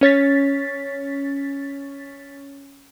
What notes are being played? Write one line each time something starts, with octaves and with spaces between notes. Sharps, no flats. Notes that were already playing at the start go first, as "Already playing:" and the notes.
C#4 C#5 A6 B6